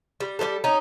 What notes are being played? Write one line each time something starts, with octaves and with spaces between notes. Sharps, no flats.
G3
G3 C4 G4 A4
C#4 D#4